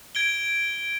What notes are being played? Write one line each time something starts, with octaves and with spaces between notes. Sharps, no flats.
G#6 D7 G7